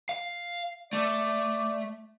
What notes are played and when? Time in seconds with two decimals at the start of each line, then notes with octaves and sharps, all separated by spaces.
0.09 F5
0.93 A3 D5